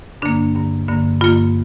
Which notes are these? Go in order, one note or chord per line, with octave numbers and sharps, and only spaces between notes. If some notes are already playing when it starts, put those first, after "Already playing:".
G2 D3 A#3 D4
G2 D3 A#3
G2 D3 A#3
G2 D3 A#3 F4